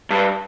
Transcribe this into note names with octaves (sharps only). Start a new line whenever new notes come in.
G2